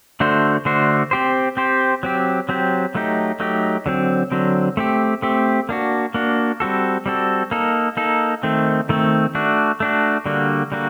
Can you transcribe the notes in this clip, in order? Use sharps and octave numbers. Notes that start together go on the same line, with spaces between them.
D3 A3 D4 F#4 C5
D3 A3 D4 F#4 C5
C4 G4 C5
C4 G4 C5
F#3 C4 G4
F#3 C4 G4
F#3 A3 D#4 G4
F#3 A3 D#4 G4
D3 F#3 C4
D3 F#3 C4
A3 C4 G4
A3 C4 G4
A#3 D4 F#4
A#3 D4 F#4
G3 C4 F#4 A4
G3 C4 F#4 A4
A#3 D#4 A4
A#3 D#4 A4
D#3 A3 C4
D#3 A3 C4
A3 D4 F#4
A3 D4 F#4
D3 G3 A#3 F#4
D3 G3 A#3 F#4